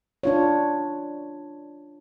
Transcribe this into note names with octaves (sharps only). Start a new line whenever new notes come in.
D4 F4 C#5